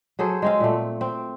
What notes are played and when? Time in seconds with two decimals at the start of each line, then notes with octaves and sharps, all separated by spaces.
0.19 F#3 G#4 A4 C5
0.42 G#3 C4 F5
0.60 A#2 A3
1.01 C4